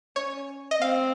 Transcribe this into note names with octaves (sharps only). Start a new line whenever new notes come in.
C#4 C#5
D#5
C4 F5